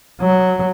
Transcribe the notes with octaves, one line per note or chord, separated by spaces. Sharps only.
F#3